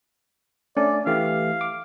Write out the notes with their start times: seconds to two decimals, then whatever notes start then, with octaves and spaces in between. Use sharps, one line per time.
0.77 A3 C#4 D4 D5
1.07 E3 A3 G4 F5
1.61 D6